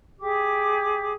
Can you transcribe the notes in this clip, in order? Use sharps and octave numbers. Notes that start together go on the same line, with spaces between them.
G4 G#4 D6